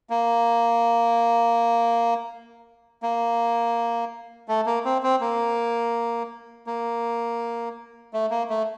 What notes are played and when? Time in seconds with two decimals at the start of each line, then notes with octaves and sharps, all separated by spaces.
0.10 A#3
3.03 A#3
4.48 A3
4.66 A#3
4.85 C4
5.03 C4
5.21 A#3
6.67 A#3
8.13 A3
8.30 A#3
8.50 A3